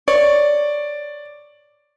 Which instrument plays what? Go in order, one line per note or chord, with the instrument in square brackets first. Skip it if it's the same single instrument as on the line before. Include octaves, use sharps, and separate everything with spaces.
[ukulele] C#5 [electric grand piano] D5